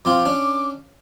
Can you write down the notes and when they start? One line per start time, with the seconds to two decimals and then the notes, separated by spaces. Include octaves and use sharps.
0.05 F2 C4 F4 D6
0.25 C#4 D4